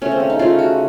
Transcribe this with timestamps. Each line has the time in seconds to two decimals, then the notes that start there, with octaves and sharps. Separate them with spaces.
0.02 C#3 A3 C#4
0.12 C4
0.20 C#4
0.30 D#4
0.39 C#3 A3 F4
0.59 F#4